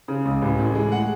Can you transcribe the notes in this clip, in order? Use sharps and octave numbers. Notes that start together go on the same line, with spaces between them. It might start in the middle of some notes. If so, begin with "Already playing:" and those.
C#3
C#2
A1
A2
G#3
F#5